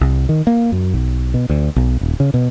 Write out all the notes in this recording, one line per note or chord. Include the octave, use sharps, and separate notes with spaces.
C2
D#3
A#3
F#2
B1
B2
D2
B1
D#1
C#3
B2